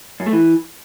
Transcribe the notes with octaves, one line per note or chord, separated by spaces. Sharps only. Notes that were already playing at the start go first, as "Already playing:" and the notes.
F#2
A3
E3